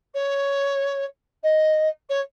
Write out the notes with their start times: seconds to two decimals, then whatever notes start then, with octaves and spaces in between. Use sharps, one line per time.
0.14 C#5
1.43 D#5
2.09 C#5